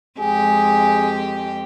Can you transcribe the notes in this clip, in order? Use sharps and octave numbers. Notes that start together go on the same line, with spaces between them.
F2 G#3 G4 G#4